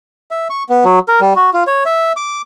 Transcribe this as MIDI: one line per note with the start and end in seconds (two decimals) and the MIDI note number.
0.31 0.48 76
0.50 0.63 85
0.69 0.84 59
0.85 0.99 54
1.08 1.20 70
1.21 1.34 55
1.36 1.50 66
1.53 1.64 65
1.67 1.84 73
1.86 2.12 76
2.16 2.42 86